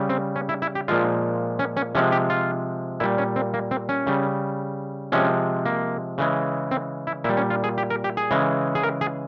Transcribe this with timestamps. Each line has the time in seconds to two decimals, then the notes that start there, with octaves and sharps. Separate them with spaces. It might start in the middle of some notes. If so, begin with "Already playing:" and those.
Already playing: C#3 G3
0.09 C4
0.36 C#4
0.49 E4
0.62 E4
0.75 G4
0.88 A#2 F3 G#3 F4
1.59 C#4
1.77 C#4
1.95 C3 F3 G#3 C#4
2.12 G4
2.30 F4
3.00 A#2 G3 E4
3.18 C#4
3.36 C4
3.54 A#3
3.71 C4
3.89 C#4
4.07 C#3 G3
5.12 C3 F3 G#3 C#4
5.66 A#3
6.18 C#3 E3 G#3
6.71 C4
7.07 E4
7.24 A#2 G3 E4
7.37 C#4
7.50 F4
7.64 G#4
7.78 G4
7.90 A#4
8.04 G4
8.17 G#4
8.31 C#3 E3 G#3
8.75 G#4
8.83 A#4
9.01 G#4